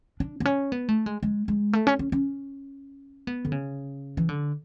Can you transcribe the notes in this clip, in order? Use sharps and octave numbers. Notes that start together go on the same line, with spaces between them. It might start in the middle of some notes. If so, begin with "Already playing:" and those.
D4
B3
C#4
B3
A3
G#3
G#3
G#3
A3
C#4
C#4
C#4
B3
D3
C#3
E3
D3